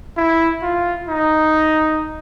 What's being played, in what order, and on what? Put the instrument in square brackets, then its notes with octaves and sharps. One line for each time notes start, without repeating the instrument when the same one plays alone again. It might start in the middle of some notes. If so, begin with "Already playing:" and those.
[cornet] E4
F4
D#4